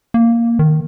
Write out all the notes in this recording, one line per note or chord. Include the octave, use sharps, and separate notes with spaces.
A#3
D#3